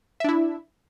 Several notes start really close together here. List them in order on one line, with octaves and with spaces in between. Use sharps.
E5 D4 E4